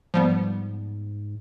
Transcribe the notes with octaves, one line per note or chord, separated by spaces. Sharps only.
G#2 F3 G3 B3